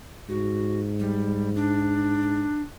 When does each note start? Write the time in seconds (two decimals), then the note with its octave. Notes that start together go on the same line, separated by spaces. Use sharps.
0.29 G#2 F#4
0.99 G3
1.55 D4